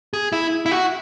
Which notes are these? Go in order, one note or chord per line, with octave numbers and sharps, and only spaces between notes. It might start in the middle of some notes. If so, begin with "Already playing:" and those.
G#4
E4
E4
F#4